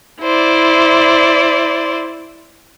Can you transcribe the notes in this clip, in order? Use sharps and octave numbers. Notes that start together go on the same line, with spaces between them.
E4 C5 D5